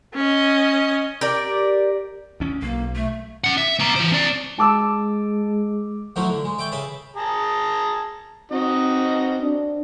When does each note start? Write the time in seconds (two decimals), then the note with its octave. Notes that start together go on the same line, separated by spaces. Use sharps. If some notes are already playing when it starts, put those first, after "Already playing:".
0.15 C#4 D#5
1.21 G4 A#4 D5
2.40 D2 C#4
2.62 B1 A#3
2.95 A3
3.44 C#4 F#5
3.58 E5
3.79 B3 A#5
3.96 E3 C5
4.12 C4 D5
4.59 G#3 A5 D6 E6
6.16 F3 F#3 A3 D#4 E4 F#4
6.30 D3
6.44 G#3
6.59 D5 E5 G5 C#6
6.72 C#3 G#4 B4 E5 A5
7.16 G#4 A5 A#5
8.52 C4 D#4 F#4 D#5
9.42 D4